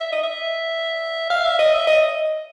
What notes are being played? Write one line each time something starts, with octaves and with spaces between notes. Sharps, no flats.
E5
D#5
E5
F5
E5
D#5
E5
D#5